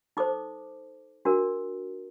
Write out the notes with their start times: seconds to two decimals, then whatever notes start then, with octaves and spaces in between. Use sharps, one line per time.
0.17 D#4 A4 C5 D6
1.25 D4 F#4 A#4